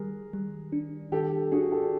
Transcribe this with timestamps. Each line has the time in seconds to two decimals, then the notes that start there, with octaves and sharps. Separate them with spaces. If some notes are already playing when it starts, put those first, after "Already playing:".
Already playing: D#3 G3 G#4 A#4
0.33 G3
0.72 D4
1.12 D#3 G4 A4
1.51 D4 F#4 G#4
1.72 G4 A4